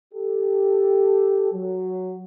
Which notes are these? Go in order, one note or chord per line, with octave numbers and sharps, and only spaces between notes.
G4 A4
F#3